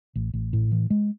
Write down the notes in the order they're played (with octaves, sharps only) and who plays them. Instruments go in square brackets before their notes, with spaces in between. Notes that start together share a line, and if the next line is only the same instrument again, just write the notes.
[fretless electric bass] A1
A1
A2
E3
G#3